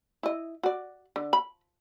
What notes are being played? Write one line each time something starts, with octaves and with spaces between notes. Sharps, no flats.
E4 D#5
F#4 D5
D3
B5